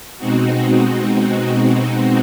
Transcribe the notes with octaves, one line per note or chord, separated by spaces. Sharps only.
B2 G#3 C4 D#4 F#4